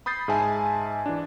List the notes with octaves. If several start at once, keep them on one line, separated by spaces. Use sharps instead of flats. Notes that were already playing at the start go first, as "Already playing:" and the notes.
B5 D#6 G6 A6 C7
G#2 G#4 E5 G#5 A5
E3 D4